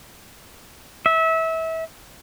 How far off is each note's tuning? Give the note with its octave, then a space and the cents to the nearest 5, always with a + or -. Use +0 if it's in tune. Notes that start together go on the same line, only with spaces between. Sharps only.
E5 -25